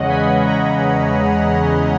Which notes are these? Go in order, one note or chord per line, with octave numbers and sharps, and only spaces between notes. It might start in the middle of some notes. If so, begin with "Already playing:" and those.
Already playing: E2 C#3 G#3 C#4 D#5 F#5
G#5 B5
F#5 A#5